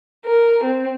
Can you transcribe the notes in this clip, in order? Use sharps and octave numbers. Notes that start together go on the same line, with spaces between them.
A#4
C4